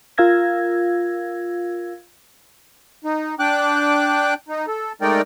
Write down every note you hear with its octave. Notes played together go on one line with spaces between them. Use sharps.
F4 A#4 F5 E6 G#6 A#6
D#4
D4 G5 D6 F#6
D#4
A4
G#3 A3 D#4 A#4 D5 G5